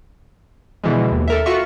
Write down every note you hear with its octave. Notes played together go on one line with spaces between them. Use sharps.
B2 D3 E3 F3 G#3
D#2
A4 A#4 E5
F4 F#4 E5 C#6